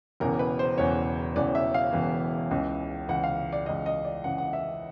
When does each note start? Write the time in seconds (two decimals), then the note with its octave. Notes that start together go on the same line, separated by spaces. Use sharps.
0.20 E1 E2 C#3 E3 A#4
0.39 B4
0.59 C5
0.77 E1 E2 C#3 E3 C#5
1.36 E1 E2 C#3 E3 D5
1.55 E5
1.74 F5
1.93 E1 E2 C#3 E3
2.51 C#2 C#3 E3
3.08 C#2 C#3 E3 F#5
3.24 F5
3.52 D5
3.66 C#2 C#3 E3 D#5
3.86 D#5
4.05 D5
4.24 C#2 C#3 E3 F#5
4.38 F#5
4.53 E5